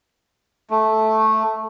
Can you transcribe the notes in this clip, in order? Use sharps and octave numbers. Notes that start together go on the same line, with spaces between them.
A3